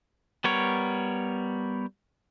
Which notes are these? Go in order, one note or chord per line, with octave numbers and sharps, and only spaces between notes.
G3 B3 A#4 C#5